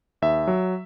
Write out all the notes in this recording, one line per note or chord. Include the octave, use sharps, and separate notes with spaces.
D#2 E5
F#3